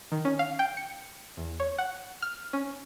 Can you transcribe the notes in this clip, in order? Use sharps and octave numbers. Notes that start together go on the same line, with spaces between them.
D#3
C#4
F5
G5
C#7
E2
C#5
F#5
F6
C#4